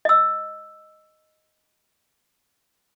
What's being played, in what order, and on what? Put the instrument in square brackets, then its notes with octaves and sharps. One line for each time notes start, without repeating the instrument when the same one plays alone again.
[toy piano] D#5 E6